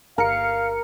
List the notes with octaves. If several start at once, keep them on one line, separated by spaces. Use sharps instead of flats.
G1 A#4 F5 C#7